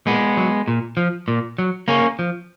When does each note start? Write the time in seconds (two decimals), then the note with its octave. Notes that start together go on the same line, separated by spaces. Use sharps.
0.06 A#2 G#3 B3
0.37 F#3
0.68 A#2
0.97 F3
1.28 A#2
1.58 F#3
1.88 C#3 A#3 C#4
2.19 F3